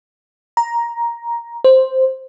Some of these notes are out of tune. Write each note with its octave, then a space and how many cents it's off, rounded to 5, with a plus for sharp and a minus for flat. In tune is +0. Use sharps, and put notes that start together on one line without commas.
A#5 +10
C5 +0